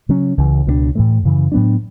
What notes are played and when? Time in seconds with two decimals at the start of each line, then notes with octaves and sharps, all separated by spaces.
0.09 C#3 F#3 C#4
0.37 C#2 C#3 E3
0.67 C#2 B2 G3 D4
0.95 A2 E3 A3
1.24 F#2 C#3 E3
1.52 A2 F#3 B3 D4